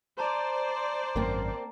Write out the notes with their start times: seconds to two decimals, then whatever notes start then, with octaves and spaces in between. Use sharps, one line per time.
0.18 C5 D5 A5 A#5 C6
1.16 G#1 F#2 A#3 C4